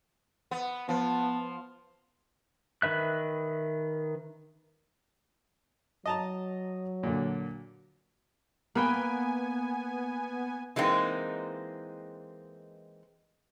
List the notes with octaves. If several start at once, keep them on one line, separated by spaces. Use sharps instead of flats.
B3
F3 B3 A5
D#3 B4 E5 F#6
F#3 D#5 A5 A#5
A#2 D3
A#3 B3 B4 G5 G#5
E3 G#3 A#3 C4 D#4